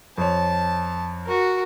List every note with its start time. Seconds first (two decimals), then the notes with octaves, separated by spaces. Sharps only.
0.18 F2 C#5 A5
1.25 F#4 A#4